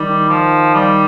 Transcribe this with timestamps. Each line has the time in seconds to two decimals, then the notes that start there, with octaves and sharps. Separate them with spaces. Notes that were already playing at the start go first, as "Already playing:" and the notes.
Already playing: D#3 G3
0.29 F3
0.74 G3